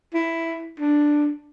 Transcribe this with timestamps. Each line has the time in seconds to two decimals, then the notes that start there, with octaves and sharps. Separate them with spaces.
0.14 E4
0.80 D4